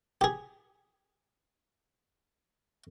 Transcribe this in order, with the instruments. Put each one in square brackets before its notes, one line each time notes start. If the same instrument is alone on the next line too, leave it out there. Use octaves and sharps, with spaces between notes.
[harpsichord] G4 G#4